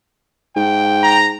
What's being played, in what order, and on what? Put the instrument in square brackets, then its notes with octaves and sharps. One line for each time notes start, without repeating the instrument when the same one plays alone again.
[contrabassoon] G#2 [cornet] G5
[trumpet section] A#5